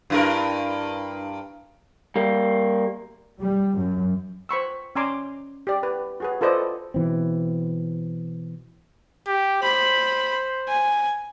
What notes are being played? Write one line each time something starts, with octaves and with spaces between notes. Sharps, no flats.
G2 E4 A#4
G3 A#3
G3
F#2
C5 B5 C#6 E6
C#4 D5 G#5 A#5 C6 D6
G4 D5
B4
F#4 G#4 B4
F4 A4 B4 C5 D5 D#5
B2 E3 C4
G4
C5 B5
G#5